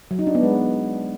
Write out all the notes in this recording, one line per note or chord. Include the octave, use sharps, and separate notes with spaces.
F#3
D#4
D4
B3
G#3